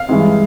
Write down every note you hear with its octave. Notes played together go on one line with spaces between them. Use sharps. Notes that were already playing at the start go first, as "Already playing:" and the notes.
Already playing: F5
G2 E3 G#3